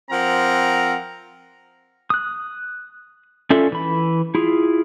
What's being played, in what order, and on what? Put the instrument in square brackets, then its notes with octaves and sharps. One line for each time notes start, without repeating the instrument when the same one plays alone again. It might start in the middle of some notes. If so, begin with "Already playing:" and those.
[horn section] F3 C4 A#4 F#5 A#5
[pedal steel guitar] D#6 F#6
C#4 F4 A4 D5 E5
E3 B5
E4 F4 G#4